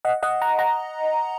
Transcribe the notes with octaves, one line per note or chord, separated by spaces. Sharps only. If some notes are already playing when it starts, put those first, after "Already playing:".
D#5 F#5
D#5 F#5
F#5 A#5
F#5 A#5